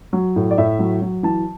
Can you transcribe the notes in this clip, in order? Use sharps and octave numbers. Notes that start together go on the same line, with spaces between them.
F#3
A2
D5
A2 E5
F#3
F#3
E3 A5